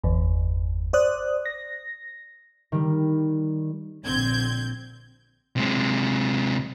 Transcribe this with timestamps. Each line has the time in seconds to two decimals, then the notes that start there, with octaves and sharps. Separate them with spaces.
0.04 G1 E2
0.93 C5 D5 D#6 F#6
1.46 A#6
2.72 D#3 G3
4.05 A#1 D3 C4 G6 G#6
5.57 C3 G#3